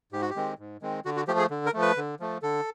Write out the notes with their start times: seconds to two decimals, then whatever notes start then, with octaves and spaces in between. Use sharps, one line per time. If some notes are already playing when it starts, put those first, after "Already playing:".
0.12 G#2 G4
0.21 F#4
0.30 G4
0.36 D#3 G#3 C4
0.59 G#2
0.82 D#3 G#3 C4
1.05 D3 F#4
1.16 F#4
1.28 F3 A3 G4
1.39 G#4
1.50 D3
1.66 A#4
1.74 F3 A3
1.82 B4
1.97 D3
2.20 F3 A3
2.42 D3 A4